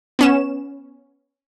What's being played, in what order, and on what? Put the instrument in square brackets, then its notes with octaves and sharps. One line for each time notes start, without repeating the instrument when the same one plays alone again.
[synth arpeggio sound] B3 C#4 E7